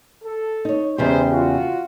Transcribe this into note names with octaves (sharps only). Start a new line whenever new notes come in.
A4
D#4 C#5
E2 C#3 G#3 D#4 G4 C5
F4 F#4